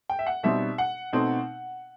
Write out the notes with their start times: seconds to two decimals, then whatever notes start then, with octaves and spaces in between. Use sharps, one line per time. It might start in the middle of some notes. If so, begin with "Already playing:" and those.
0.09 G5
0.19 E5
0.26 F#5
0.43 B2 G3 C4 D#4 E5
0.78 F#5
1.13 B2 A3 C4 D#4